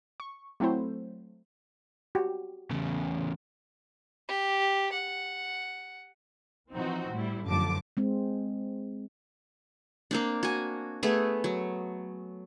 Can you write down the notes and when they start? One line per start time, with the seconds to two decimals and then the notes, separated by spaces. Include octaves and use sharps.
0.20 C#6
0.60 F#3 A3 C4 E4 C5
2.15 F#4 G4
2.71 E2 C#3
4.28 G4
4.93 F#5
6.72 E3 F3 C4 D#4 F#4
7.12 A2 G3 E4
7.44 A1 F#2 D3 F3 A5 D6
7.97 G#3 C4
10.11 A#3 C4 D4
10.43 F#4 G#5
11.03 A3 B3 G#4
11.44 F#3